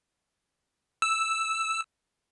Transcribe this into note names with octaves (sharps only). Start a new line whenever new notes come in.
E6